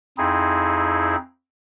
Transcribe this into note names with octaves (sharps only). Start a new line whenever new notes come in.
F2 C4 D#4 E4 G#4